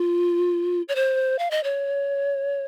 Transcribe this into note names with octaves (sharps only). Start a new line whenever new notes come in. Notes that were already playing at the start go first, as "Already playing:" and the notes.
Already playing: F4
C#5
C5
F5
D#5
C#5